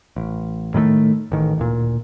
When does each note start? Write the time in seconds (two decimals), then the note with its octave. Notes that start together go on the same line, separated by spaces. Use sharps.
0.16 A1
0.74 A2 D#3 E3 A3
1.32 A1 D#3
1.58 D1 A#2